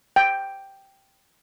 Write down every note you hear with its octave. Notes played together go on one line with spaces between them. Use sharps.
G5